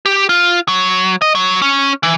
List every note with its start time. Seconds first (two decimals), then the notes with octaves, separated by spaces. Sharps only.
0.06 G4
0.29 F4
0.68 F#3
1.22 D#5
1.35 F#3
1.62 C#4
2.03 E3